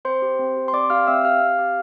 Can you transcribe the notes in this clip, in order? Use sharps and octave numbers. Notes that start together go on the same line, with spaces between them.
C4 C5 C6
G4
C4
G4
C6
C4 D5 D6
G4 F5 F6
C4 E5 E6
G4 F5 F6
C4
G4